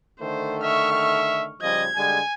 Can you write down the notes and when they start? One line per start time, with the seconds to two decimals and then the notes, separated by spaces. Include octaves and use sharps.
0.20 D3 D#3 A3 C5
0.63 E5 C#6 F6
0.92 E5
1.62 C#3 F3 G3 D#5 G#6
1.96 D3 G3 G#3 G#5